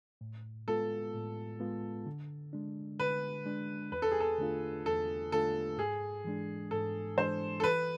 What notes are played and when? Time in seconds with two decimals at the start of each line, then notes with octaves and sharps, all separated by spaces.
0.21 A2
0.68 G#3 B3 F4 A4
1.14 A2
1.60 G#3 B3 F4
2.06 D3
2.53 G#3 D4
2.99 D3 B4
3.46 G#3 D4
3.92 E2 B4
4.02 A4
4.11 G#4
4.20 A4
4.38 D3 A3 D4 F4
4.86 E2 A4
5.32 D3 A3 D4 F4 A4
5.78 G#2 G#4
6.25 E3 G#3 D4
6.71 G#2 A4
7.17 E3 G#3 D4 C5
7.60 A4
7.64 E3 B4